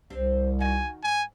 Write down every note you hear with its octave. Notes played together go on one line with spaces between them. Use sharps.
C2 C4 D4 G4
D#3 D#4 F#4 G#5
G#2 G#5